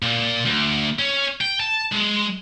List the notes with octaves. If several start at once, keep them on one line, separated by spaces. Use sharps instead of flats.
A#2
D2
C#4
G5
A5
G#3